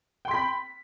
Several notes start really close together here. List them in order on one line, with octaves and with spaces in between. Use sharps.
G5 C6 B6 B5